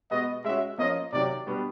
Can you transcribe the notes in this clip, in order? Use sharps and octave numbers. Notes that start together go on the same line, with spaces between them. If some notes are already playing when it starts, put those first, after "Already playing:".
B2 G#3 B3 D#5
G#3 C#4 F#4 E5
F3 A#3 C#4 F4 D#5
C3 D#3 F#3 D5
B2 G3 B3 D4